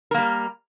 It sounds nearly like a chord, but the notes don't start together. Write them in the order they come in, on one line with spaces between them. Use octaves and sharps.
A#4 A#3 G3